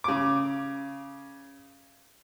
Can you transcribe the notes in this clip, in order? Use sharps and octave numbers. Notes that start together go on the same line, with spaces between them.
C#3 D6